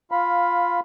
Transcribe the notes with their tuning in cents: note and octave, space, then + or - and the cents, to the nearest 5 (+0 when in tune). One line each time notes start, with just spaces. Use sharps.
F4 +0 F5 +10 B5 +0